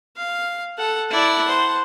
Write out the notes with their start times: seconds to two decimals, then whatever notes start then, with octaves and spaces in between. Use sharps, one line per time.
0.18 F5
0.78 A4 F#5
1.11 E4 D5 F#5 A5
1.48 C5